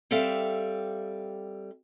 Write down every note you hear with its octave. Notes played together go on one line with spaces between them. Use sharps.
G3 C4 A4 E5 F5